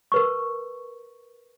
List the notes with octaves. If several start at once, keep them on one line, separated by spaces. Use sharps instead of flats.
A#4 B4 C#6